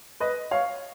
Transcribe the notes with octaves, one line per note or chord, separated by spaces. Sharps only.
B4 D#5
C#5 F5